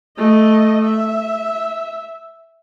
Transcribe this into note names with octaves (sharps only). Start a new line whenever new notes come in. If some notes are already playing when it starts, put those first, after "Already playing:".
A3 D#5
E5